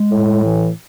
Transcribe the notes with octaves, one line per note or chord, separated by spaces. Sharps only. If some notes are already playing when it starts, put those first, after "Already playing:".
Already playing: G#3
A2
E3